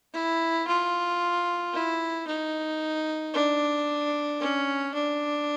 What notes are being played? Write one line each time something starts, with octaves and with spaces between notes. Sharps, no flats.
E4
F4
E4
D#4
D4
C#4
D4